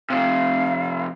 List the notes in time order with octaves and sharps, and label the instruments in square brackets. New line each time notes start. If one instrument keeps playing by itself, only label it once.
[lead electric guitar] F2 C3 [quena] F5